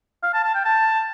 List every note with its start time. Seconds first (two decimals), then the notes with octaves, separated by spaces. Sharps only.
0.23 F5
0.34 A5
0.44 A5
0.55 G5
0.65 A5